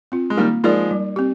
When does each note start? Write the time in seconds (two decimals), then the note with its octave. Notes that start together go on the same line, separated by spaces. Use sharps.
0.12 C4 F4
0.30 G#3
0.37 D#3 G3 A#3
0.64 F3 G#3 D#4 A#4 D5
0.91 G3
1.16 C4 G4